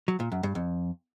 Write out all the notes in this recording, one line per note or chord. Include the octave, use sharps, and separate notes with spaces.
F#3
A#2
F#2
G2
F2